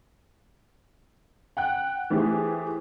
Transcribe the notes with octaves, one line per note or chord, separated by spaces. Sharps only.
F#5 G5 F#6
E3 A3 C4 G4 G#4